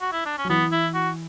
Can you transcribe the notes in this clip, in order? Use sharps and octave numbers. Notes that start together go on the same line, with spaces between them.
F#4
E4
D4
C#4
F#3
E3 B3
E4
F#4